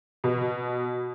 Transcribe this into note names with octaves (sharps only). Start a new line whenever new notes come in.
B2